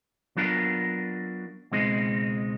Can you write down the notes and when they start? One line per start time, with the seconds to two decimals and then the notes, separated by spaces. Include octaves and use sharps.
0.37 F#3 B3 D4 F4 A#4
1.71 C#2 B2 G#3 C4 D#4